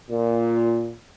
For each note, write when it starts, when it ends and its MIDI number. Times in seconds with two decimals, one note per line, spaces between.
0.11 0.93 46